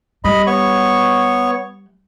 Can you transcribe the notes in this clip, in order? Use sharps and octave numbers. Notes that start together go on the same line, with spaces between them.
G3 D#5 B5
B3 C#5 C#6